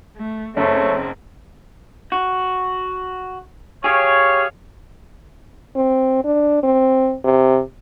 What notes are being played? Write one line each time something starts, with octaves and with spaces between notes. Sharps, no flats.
A3
F#1 A3 C4 G#4 C#5
F#4
G4 G#4 C#5 F5
C4
D4
C4
C3